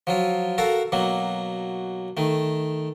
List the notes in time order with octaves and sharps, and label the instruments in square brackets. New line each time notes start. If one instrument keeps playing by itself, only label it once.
[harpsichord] F3 F#3 F4
F#4 A4 A#4 F5
B2 F#3 A#3
D#3 A3